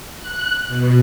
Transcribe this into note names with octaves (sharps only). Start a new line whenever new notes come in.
F#6
B2